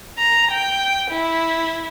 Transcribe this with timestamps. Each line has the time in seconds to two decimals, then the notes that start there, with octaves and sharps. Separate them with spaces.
0.18 A#5
0.52 G5
1.11 E4